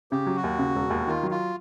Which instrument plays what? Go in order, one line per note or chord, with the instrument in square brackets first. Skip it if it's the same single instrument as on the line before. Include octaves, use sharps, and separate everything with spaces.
[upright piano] C#3 [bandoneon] G4
[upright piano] F#3
[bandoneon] F#4
[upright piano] D#2
C#3
E1
D#2
[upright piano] D#3 [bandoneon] F4
[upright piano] F#3
[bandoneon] F4